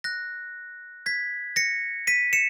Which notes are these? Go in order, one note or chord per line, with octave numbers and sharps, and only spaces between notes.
F#6 A#6
G#6 B6
A#6 C#7
B6 D#7
C#7 E7